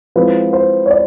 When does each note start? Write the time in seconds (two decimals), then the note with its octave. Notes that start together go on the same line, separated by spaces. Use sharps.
0.16 F3 G#3 C4 E4 B4
0.53 C5
0.86 C#5
0.91 D5